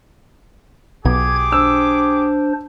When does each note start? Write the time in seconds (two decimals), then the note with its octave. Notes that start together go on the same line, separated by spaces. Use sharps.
1.05 B1 G4 G#4 D6 G#6
1.52 D4 C5 E6